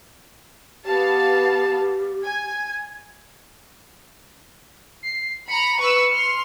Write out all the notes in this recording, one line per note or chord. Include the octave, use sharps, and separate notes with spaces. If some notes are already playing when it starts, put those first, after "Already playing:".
B3 G4 F5 A5 A6
G#5 G#6
C7
A#5 B5 C#7
B4 C#6 E6
C6 F6